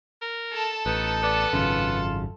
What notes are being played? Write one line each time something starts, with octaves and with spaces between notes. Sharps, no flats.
A#4
A4 A5
A1 B3 D#4
B3 D5
G#1 F#2 C#3 F4